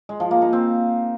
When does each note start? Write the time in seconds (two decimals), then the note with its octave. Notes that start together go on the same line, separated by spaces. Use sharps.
0.09 G#3
0.20 F3
0.31 A#3
0.42 D#4
0.53 C4